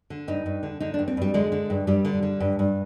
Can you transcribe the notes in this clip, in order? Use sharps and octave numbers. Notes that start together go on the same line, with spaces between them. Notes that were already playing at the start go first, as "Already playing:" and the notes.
D3
G2 D#4
G2
D3
D3 D#4
D4
G2
C4
G2 G3
D3 G#3
D3
G2
G2 G3
D3
D3
G2
G2